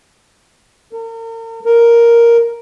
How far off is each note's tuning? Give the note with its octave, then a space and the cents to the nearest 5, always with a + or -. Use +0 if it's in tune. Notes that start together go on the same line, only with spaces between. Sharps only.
A#4 -40
A#4 +5